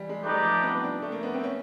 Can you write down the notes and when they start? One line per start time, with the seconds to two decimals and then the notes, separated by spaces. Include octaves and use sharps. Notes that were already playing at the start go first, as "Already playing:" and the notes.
Already playing: E3 G3
0.09 G#3
0.23 A3 D#4 G4 B4 D5
0.33 G3
0.43 F3
0.63 B3
0.68 C4
0.84 D4
1.02 A3
1.12 A#3
1.23 B3
1.34 C4
1.43 C#4